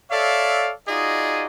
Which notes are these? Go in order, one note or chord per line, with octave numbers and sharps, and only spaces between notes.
A4 C#5 D5 E5 F5
D#4 F4 F#4 G#4 D5 D#5